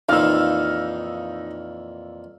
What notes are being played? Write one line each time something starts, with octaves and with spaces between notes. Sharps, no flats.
F2 A#2 E3 D#4 F5 E6